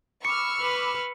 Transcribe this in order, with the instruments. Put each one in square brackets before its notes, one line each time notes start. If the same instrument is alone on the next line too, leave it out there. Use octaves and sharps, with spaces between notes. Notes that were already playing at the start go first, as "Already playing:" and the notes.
[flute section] B5 D6 [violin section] C#6 E6 F6 [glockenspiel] C#7
[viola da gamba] B4